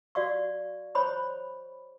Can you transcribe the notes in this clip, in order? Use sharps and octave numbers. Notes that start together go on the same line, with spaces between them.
F#4 D5 F5 C#6
C5 C#5 B5 C#6